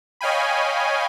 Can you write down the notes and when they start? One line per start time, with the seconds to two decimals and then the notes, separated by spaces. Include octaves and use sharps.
0.21 C#5 D#5 F5 G5 G#5 B5